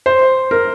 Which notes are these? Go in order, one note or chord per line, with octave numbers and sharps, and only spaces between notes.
C5
A#4